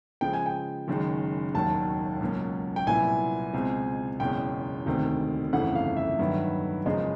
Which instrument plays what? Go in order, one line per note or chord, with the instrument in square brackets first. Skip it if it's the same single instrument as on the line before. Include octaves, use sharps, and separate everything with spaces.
[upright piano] C#3 F3 G#3 [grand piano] G5
[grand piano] G#5
G5
[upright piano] F#1 F#2 D#3 G#3
[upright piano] E1 D#2 D#3 F#3 [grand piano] A5
[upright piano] C#2 B2 F#3 A#3 C#4
[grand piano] G5
[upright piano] C2 A#2 F#3 B3 E4 [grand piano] G#5
[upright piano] C#2 B2 G#3 C4
[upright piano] F#1 E2 B2 G#3 C#4 [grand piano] G5
[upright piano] E1 D2 C3 D#3
[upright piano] G1 F2 C#3 E3 A3 [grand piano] F#5
[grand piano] F5
E5
[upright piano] G2 D#3 F#3 B3
[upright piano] F#1 F#2 C#3 F3 G#3 [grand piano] D#5